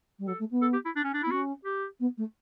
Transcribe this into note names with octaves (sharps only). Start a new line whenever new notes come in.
G3
F#3 A4
A3
B3
A4
G4
E4
D4
C#4
D4
E4
B3
C#4 F#4
G4
B3
A3